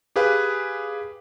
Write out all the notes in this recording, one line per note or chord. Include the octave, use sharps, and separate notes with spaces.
G4 G#4 B4 F5